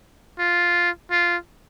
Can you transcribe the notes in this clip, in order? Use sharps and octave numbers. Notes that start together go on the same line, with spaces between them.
F4
F4